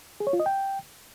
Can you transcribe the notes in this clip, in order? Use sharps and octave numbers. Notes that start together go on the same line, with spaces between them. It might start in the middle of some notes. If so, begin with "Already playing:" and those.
G#4
C#5
F4
D#5
G5